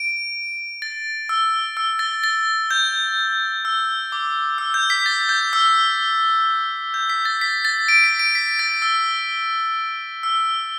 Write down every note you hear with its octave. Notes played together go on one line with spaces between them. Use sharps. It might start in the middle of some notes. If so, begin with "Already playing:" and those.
Already playing: D7
A6
E6
E6
A6
A6
G6
E6
D6
E6
G6
B6
A6
G6
E6
G6
B6
A6
B6
A6
D7
B6
D7
B6
A6
E6
E6